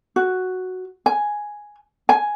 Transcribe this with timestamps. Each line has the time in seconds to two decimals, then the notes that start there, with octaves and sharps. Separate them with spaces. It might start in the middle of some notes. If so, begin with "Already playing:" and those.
0.16 F#4
1.06 G#5
2.09 G#5